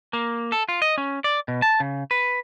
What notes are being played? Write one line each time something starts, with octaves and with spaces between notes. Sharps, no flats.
A#3
A4
F4
D#5
C#4
D5
B2
A5
C#3
B4